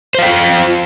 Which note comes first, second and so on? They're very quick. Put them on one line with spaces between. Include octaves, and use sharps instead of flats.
C5 F5 G5 F4